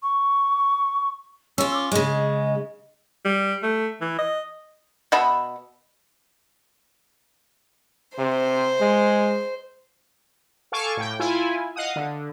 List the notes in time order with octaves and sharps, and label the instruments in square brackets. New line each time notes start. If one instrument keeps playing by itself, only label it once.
[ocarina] C#6
[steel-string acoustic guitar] C#4 F4 [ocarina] E6
[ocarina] D6
[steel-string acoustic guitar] C#3 G#3 [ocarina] D#5
[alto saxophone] G3
A3
E3
D#5
[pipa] B2 D#5 E5 B5
[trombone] C3 [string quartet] C5
[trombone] G#3
[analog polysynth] A4 F5 G#5 C#6 D6
A2 G5
E4 F4 G#5
D#5 F5 F#5 D#6
D3